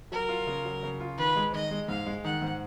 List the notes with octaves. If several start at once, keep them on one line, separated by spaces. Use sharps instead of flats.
F#3 A#4
F4
C#3
F#3
C#3
F4
D#3 B4
G#3
D#3 D#5
G#3
G#2 F5
G#3
D#3 F#5
G#2